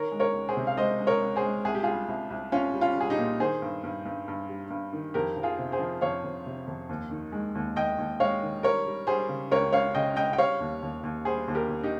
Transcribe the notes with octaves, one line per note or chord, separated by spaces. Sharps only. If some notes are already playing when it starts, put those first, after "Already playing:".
Already playing: D#3 A#4 C#5
G#3
A#4 C#5
C#2
G#4 C5
C3
F5
G#3 C5 D#5
G#3
A#4 C#5
C#2
G#4 C5
G#3
C2 G#4
G4
G3 F4 G#4
C2
C2
C2 C#4 F4
G3
C#4 F4
G3 G#4
D#4 G4
A#2
D#3 G#4 C5
G2
G2
G2
G2
G3
G2
D#3
F2 G4 A#4
F3
F4 G#4
C3
G#4 C5
F3
F2 C#5 F5
F2
C3
F2
D#2
D#3
G#3
D#2
D#2 D#5 G5
D#2
G#3 C#5 F5
D#3
G3 A#4 C#5
G3
G3 G#4 C5
C#3
C#2 A#4 C#5
C#2 C#5 F5
C#3 D#5 G5
C#2 D#5 G5
G5
G3 C#5 F5
D#2
D#2
D#2
G3 G#4 C5
D#2
G4 A#4
D#2
D#4 G4